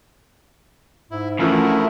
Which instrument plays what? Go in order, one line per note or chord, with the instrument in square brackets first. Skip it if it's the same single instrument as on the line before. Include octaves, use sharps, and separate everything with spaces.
[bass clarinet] G#2 [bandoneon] E4
[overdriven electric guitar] D2 [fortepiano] E3 F3 [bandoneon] A3 E4 A#4 [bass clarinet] C#4